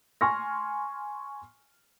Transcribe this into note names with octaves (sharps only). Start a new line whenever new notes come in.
G#5 C6 C#6 F6 A#6